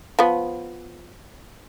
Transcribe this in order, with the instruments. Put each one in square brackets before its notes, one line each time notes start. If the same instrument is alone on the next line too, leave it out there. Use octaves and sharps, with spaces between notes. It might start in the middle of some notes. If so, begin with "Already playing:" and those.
[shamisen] F3 B3